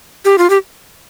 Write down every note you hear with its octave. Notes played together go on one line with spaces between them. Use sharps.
G4
F4
G4